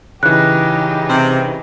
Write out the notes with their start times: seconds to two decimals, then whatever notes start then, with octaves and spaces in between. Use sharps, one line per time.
0.23 C#3 E3 D#4 G4 F#6
1.10 C3